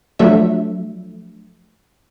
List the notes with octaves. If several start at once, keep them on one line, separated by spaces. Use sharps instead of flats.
F3 F#3 A3 D4 E5